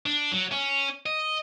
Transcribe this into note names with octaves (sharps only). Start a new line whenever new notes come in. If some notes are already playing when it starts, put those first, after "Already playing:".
D4
F#3
C#4
D#5